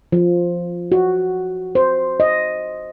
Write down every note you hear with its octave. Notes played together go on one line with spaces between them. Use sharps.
F3
F#4
C5
D#5